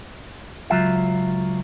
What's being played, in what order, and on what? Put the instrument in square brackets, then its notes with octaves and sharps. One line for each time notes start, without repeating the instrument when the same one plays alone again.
[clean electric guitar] C#2 F#3 F4 E5